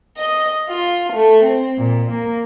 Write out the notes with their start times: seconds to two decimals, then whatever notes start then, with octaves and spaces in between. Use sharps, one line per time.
0.17 D#5
0.69 F4
1.13 A3
1.44 C4
1.78 A#2
2.11 A#3